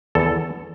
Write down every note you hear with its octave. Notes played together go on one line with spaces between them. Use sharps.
E2 A4